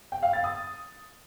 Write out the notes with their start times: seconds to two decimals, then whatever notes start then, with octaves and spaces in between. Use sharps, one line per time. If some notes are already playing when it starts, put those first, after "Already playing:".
0.12 G5
0.23 F5
0.33 A6
0.44 D#6